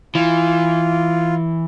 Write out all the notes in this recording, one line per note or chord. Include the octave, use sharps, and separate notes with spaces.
E3 F4